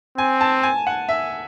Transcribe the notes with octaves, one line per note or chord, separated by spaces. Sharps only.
C4 G#5
A5
G#5
F#5
E5